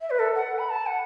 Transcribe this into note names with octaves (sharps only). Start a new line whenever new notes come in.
E5
B4
A4
F#5
B5
A5
F#5